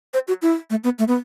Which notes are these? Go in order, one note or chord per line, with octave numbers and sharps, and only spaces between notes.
C5
F#4
E4
A3
B3
A3
B3